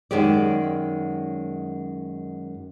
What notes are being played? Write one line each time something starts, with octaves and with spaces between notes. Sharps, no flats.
F#2 D#3 G#3 G4 D5